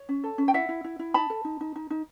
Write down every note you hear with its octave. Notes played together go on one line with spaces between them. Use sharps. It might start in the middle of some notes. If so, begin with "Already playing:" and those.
Already playing: C#5
C#4
A4
C#4
G5
E4 E5 F#5
E4
E4
E4
D#4 A5 B5
A4
D#4
D#4
D#4
D#4